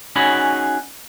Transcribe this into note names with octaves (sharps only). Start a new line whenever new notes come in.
C#4 D#4 F#4 G#4 C#5 B5